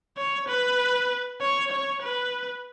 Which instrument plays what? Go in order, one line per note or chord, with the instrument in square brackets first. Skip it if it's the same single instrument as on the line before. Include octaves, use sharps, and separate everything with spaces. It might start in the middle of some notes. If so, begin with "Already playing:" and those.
[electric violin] C#5
B4
C#5
C#5
B4